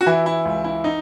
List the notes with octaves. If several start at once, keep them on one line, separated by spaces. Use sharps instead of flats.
F#4
E3 E4
E4
C#2
E4
D#4